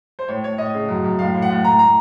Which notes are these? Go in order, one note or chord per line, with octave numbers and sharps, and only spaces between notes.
C5
A2 C#5
A2 C#5
A2 D#5
C#3
F#2
F#2
A2 F5
A2
F#5
A2
A2 A#5
A2 A#5